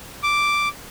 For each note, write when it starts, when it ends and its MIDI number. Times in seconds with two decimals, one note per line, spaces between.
0.23 0.68 86